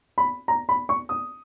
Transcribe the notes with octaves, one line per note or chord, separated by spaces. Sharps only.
B5
A#5
B5
C#6
D#6